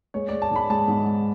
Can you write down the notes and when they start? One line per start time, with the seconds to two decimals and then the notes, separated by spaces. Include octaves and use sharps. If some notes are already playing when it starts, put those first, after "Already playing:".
0.14 G#3 C#5
0.29 G#3 D5
0.42 A5
0.51 G#2 B5
0.70 G#3 A5
0.88 G#2
1.06 G#3